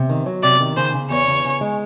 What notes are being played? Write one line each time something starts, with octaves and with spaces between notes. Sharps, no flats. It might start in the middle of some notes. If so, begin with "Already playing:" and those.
Already playing: C3
D#3
F#3
C3 D5
D#3
C#3 C5
C#3
E2 C#5
C#3
C#3
G#3